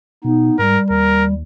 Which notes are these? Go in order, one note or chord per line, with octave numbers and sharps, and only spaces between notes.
B2 B3 D#4
G#2 G3 A#4
D#2 A#4